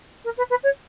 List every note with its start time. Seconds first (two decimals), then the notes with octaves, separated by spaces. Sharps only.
0.24 A#4
0.37 B4
0.50 B4
0.63 C#5